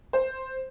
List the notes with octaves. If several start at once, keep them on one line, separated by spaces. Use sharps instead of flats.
C5